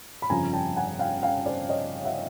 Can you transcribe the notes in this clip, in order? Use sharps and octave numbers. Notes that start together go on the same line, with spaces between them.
B5
G1 F2 C#3 F3 G#5 A#5
G5 A5
F#5 G#5
F5 G5
F5 G5
C5 D5
C#5 D#5
E5 F#5